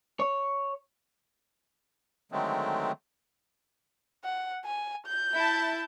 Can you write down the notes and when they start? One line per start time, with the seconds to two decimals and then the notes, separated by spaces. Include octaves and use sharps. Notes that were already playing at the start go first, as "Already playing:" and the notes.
0.20 C#5
2.32 D3 D#3 F#3 G#3 A3 C4
4.24 F#5
4.65 G#5
5.07 G6
5.36 E4 A5